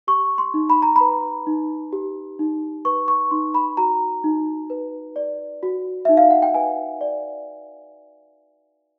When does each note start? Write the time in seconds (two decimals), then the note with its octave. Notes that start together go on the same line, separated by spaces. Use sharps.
0.07 G4 C#6
0.38 C6
0.54 D#4
0.70 B5
0.82 A#5
0.96 B4 B5
1.47 D#4
1.93 G4
2.39 D#4
2.85 B4 C#6
3.08 C#6
3.31 D#4 C6
3.54 B5
3.77 F#4 A#5
4.24 D#4
4.70 B4
5.16 D5
5.63 F#4
6.05 D#4 E5
6.17 F5
6.30 F#5
6.42 G5
6.54 B4 G#5
7.01 D5